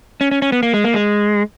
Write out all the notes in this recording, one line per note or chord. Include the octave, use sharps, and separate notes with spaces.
C#4
C#4
C#4
B3
A#3
G#3
A#3
G#3